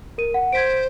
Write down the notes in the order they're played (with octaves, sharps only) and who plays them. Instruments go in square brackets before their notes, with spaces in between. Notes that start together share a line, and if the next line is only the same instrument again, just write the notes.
[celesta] A#4 D#7
F#5
[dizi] C5 [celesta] G#6 B6 D7